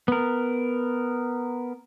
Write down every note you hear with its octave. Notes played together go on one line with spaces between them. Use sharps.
B3 A#4